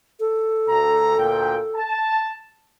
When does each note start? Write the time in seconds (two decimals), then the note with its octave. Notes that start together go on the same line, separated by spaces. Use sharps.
0.20 A4
0.68 D2 A#5
1.17 D2 A#2 G5
1.75 A5